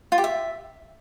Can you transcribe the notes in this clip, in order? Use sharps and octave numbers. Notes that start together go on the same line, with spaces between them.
F4
G4
E5